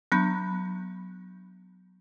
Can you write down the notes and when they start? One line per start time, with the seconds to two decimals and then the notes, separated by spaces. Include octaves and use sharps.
0.12 F#3 B3 D4 B5 G6